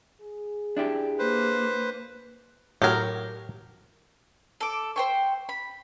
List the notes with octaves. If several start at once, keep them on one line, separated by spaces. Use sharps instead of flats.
G#4
D4 E4 G4
A#3 B4 C5
A2 F#3 G4 A#4
A4 D6
C5 G5 C#6
B5